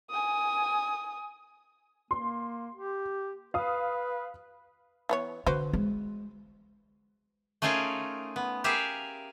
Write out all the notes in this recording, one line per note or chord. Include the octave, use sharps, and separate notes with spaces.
G#5 D#6
A#3 C6
G4
B4 F5 D#6
E3 B3 C#5
D3 F#4 B4 C5
G#3
A3 C#4 D#4 F4 G#4 A#4
B3
G4 G#4 A#4 E5 F5